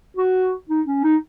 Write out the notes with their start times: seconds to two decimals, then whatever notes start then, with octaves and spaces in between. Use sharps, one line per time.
0.17 F#4
0.69 D#4
0.87 C#4
1.04 D#4